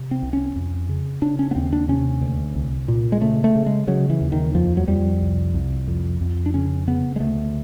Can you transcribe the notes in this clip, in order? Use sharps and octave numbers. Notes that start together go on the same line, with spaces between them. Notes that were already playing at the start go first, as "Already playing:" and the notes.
Already playing: C3
C4
C2
C#4
F2
C#3
C#3 D4
C#4
B3
D#2 C4
D4
C3 C#4
D2
C2
A#2
G#3
C#3 A3
A3
C#3
G#3
C#3 F#3
E3
D#2
D#3
F2 F3
F#3
F2 G3
C2
C2
F2
F2
D4
C#3 C#4
C#3 B3
G#3
D2 A3